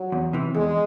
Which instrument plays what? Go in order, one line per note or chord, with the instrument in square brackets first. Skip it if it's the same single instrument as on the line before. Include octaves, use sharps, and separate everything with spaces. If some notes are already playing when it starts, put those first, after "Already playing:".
Already playing: [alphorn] F#3
[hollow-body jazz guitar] E2
C3 E3
[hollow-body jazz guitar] E2 [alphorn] G#3